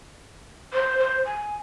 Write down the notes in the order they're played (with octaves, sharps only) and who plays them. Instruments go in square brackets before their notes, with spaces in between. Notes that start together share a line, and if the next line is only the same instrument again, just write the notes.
[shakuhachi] C5
C5
G#5